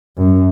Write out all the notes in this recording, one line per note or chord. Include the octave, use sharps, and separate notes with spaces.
F#2